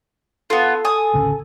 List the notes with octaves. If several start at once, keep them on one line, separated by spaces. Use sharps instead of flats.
B3 F4 A4
G#5 D#6
A1 D2 C#3